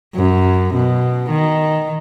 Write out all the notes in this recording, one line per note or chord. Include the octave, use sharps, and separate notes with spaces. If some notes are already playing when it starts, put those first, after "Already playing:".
F#2
B2
D#3